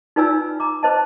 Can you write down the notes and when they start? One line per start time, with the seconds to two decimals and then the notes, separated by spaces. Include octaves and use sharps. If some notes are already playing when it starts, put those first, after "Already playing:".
0.16 D#4 F4 B4 D5 G#5 E6
0.60 A#5 D6
0.83 B4 C5 D#5 A5